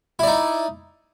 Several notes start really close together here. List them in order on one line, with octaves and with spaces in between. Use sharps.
E4 D5 D#4